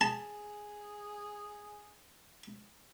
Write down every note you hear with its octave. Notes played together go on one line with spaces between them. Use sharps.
G#4 A5